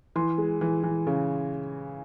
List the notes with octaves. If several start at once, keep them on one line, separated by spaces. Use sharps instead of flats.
E3 C6
G#3
E3
E3
C#3